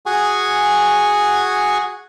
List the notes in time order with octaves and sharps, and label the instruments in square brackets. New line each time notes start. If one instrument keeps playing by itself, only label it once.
[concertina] F#4 G#4 F#5 G#5 C#6